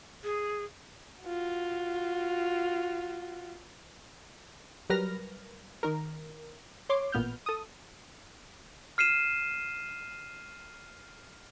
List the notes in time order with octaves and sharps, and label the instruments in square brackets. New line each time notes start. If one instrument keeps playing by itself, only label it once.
[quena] G#4
[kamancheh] F4 F#4
[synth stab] F#3 G3 A#4 B4 F6 A#6
D#3 A#4
C#5 C6 D6
A1 A#2 B3 F6 G6
A4 D#6
[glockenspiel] F6 C7 D#7 E7